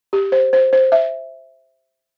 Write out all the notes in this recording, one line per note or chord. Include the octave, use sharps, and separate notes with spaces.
G4
C5
C5
C5
E5